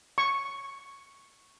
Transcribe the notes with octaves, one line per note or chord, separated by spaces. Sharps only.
C#6